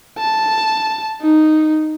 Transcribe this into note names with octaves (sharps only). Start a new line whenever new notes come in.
A5
D#4